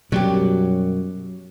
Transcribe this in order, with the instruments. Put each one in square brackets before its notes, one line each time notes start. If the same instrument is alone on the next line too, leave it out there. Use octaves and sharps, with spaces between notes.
[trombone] F#2 [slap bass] B2 G3 [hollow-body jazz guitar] F#3 G4